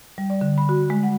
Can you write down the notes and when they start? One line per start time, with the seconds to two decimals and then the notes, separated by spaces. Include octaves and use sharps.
0.18 G3
0.30 D5
0.41 D3
0.58 B5
0.69 F#4
0.90 G#3
1.03 F#5